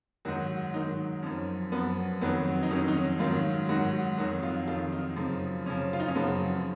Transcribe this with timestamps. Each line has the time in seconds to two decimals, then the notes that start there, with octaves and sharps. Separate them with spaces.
0.25 G#2 D#3 F#3 F#4
0.74 G#2 D#3 F#3 D#4
1.23 F#2 F3 C#4
1.72 F#2 F3 B3
2.22 F2 D#3 F#3 B3
2.63 D#4
2.71 F2 D#3 F#3 C#4
2.88 D#4
2.95 C#4
3.19 G#2 D#3 F#3 F4
3.69 G#2 D#3 F#3 F#4
4.18 F2 D#3 F#3 F#4
4.43 F4
4.67 F2 D#3 F#3 F4
4.92 D#4
5.16 F#2 C#3 F3
5.66 F#2 C#3 F3 C#4
5.93 F4
6.00 D#4
6.08 C#4
6.15 F#2 C#3 F3 B3